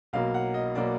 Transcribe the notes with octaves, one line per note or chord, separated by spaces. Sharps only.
B1 B2 F#3 A#3 F5
F#5
D#5
B2 F#3 A#3 D5